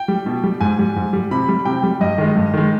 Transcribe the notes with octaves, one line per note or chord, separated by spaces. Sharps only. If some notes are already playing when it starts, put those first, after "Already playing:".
Already playing: G5
G3
B2
G3
G#2 G#5
G3
G#2
G3
C3 B5
G3
C3 G5
G3
G2 D#5
D#3 G#3
G2
D#3 G#3